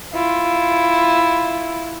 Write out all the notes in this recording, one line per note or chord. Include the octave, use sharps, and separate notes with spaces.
E4 F4